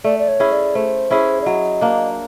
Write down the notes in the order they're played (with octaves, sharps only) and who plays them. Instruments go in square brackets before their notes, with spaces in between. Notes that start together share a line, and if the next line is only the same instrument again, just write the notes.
[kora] A3 [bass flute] D5
[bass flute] D5
C#5
[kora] C#4 E4 G#4
[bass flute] D5
[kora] A3 [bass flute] C5
[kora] C#4 E4 G#4
[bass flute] D5
[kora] F#3 [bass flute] D#5
[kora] A#3 D4